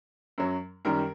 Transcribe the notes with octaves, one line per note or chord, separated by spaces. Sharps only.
F#2 F#3
F#2 D#3 G3 A#4